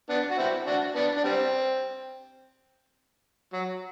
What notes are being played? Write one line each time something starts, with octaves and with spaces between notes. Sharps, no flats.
B3 D4
F#4
C4 E4
D4 F#4
B3 D4
D4
G3 C4
F#3